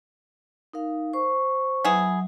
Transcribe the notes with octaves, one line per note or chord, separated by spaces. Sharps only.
D#4 A#4 F5
C5 C#6
F#3 B3 E4 G#4